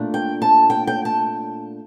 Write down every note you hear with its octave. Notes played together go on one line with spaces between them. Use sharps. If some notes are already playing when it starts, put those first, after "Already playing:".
Already playing: A#2 A3 D4
G5
A5
G5
G5
A5